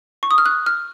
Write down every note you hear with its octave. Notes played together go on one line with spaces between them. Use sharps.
C#6
D#6
F6
F#6
F6